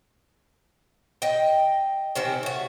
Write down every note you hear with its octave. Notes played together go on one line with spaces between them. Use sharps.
D#5 G5
C3 D#3 C4 C#4
A3 F#4